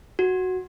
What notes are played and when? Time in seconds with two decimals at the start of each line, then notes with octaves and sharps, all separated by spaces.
0.19 F#4